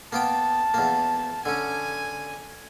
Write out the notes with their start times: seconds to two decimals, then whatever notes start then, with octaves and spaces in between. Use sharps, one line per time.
0.13 A#3 B3 G5 A5
0.74 E2 A#3
1.46 D3 C#4 G#5